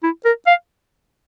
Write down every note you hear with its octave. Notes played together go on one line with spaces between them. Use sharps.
E4
A#4
F5